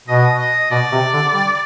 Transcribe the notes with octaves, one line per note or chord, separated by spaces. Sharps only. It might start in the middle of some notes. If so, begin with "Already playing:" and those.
B2 D#5
D#5
B2 D5
C3
D3
G3